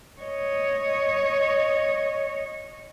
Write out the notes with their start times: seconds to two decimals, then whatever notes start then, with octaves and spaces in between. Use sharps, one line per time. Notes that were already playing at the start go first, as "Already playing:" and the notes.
0.20 C#5 D#5